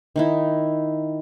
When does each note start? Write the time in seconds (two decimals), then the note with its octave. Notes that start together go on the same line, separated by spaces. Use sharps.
0.16 D#3 D#4 E4